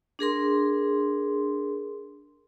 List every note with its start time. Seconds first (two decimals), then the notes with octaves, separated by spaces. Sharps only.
0.19 D4 G#4 A#4 C6